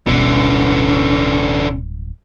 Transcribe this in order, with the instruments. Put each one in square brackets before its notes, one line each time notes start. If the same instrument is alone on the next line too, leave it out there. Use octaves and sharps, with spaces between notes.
[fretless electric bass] D1 G1 G2 [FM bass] B2 [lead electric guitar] D3 E3 [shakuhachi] C#4